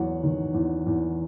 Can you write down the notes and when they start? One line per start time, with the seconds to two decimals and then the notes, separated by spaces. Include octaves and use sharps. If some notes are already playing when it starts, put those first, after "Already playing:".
Already playing: E2 F#3 F#5
0.23 D#3
0.54 E2
0.86 E2